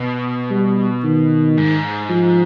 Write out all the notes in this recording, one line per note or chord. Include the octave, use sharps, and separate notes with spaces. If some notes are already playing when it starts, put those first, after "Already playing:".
Already playing: B2
G3
D#3
G#2
F3